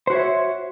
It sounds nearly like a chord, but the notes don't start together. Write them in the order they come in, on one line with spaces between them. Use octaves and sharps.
C5 F#4 C#5 E5